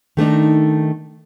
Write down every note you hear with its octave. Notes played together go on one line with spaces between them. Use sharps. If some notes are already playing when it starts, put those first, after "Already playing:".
D#3 A3 D4 D#4